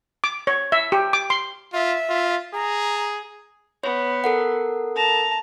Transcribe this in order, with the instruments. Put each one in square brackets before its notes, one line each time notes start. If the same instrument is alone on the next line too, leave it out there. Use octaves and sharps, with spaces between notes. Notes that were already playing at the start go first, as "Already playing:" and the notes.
[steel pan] D6
C#5
E5
G4
D6
C6
[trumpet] F4 [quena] E5
[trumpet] F4
[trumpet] G#4 [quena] A#5
[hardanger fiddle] B3 [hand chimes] C#5
[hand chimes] A4 A#4 F#5
[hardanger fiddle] A5 A#5